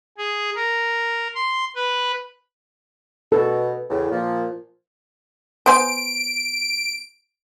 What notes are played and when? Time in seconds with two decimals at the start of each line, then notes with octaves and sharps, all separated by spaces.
0.18 G#4
0.55 A#4
1.35 C6
1.75 B4
3.32 B2 A4
3.90 E2 A2 C#3
4.12 A#2 F3
5.66 B3 C5 G#5 D7